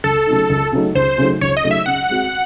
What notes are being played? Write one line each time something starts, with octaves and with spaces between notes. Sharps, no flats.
C#2 A4
C#3 F#3 A3 D#4
C#2
C#3 F#3 A3 D#4
C#2 C5
C#3 F#3 A3 D#4
C#2 C#5
D#5
C#3 F#3 A3 D#4
E5
C#3 F#5
G#3 C4 F#4